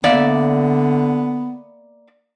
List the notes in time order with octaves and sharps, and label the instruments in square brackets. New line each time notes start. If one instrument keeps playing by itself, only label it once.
[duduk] D3 [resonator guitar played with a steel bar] A#3 D5 E5 [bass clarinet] B3